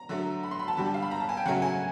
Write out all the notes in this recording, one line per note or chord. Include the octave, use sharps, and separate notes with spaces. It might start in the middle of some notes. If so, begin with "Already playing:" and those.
Already playing: A#5
D3 F#3 A3
B5
C6
B5
A5
D3 G3 B5
A5
F5
B5
A#5
A5
G#5
G5
C#3 F#3 A3 F#5
G#5